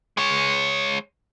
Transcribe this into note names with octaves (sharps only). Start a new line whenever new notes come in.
G#3 C#5